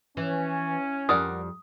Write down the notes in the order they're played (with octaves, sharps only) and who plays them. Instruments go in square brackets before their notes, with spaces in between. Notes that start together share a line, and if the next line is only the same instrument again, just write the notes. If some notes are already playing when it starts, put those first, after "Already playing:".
[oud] E3 [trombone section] C#4
[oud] F2 G3 [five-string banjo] A#4 D5 F#5 [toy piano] D#6